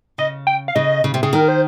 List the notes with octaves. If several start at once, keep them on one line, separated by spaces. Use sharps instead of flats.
C#3 D#5
G5
F5
C#3 D#5
C#3
C3
C#3 G#4
D#3 A#4
C5